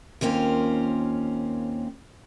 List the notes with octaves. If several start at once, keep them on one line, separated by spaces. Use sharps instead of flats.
D#2 A#3 C4 C#4 F4